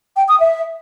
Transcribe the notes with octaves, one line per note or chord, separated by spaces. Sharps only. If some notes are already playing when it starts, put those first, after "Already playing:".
G5
D#6
E5